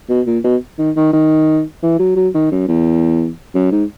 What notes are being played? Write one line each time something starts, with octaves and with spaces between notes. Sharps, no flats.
B2
A#2
B2
D#3
D#3
D#3
E3
F#3
F#3
D#3
F#2
E2
F#2
G#2